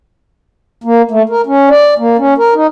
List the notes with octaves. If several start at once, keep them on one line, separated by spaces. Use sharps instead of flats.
A#3
A3
A#4
C#4
D5
A#3
C#4
A#4
D#4